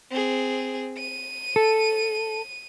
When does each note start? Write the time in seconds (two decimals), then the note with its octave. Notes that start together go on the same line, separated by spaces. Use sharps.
0.11 C4 G#4
0.98 D#7
1.56 A4